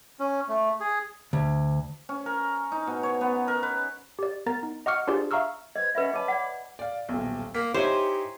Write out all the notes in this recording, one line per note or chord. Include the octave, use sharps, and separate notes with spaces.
C#4
A3
G#4
D2
C#4
A#4
D#4
B2
C#5
B3
A#4
B4
G4 D5
B3 A#4 A#5 A6
D#4
D#5 F#5 C#6 D6 F6 C#7
D4 F4 G4 G#4 C5 D5
E5 F5 A#5 C#6 E6 F6
B4 C5 D#5 G#6
C#4 B4 D#5 E5 F#5 B5
C#5 D#5 A5 B5 D6
D5 F#5
D5 F5
D#1 B1
A#3 B6
D#4 E4 G4 C5 C#5 G#5